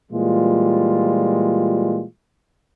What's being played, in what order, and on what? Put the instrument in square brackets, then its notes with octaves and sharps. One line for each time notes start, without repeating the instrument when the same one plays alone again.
[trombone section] A#2 E3 G3 G#3 F4